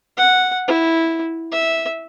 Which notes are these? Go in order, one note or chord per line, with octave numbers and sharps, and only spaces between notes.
F#5
E4
E5